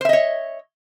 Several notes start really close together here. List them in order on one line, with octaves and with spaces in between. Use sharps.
C5 E5 D#5 C#5